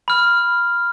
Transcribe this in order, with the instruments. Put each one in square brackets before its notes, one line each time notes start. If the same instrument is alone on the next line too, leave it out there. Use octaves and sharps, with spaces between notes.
[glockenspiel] B5 F6